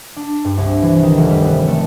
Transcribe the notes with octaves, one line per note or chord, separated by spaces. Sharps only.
D4
G2
C2
E3
D#3
F1
G3
B3
A3